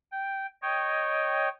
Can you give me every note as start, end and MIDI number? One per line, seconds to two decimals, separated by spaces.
0.12 0.46 79
0.62 1.49 73
0.62 1.49 75
0.62 1.49 79